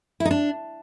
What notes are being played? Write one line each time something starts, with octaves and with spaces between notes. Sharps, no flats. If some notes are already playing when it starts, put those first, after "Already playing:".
E4
D#4
D4